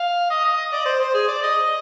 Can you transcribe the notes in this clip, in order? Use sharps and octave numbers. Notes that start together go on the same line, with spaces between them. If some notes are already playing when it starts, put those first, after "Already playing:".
Already playing: F5
D#5
D#5
D#5
D5
C5
C5
G#4
D5
D#5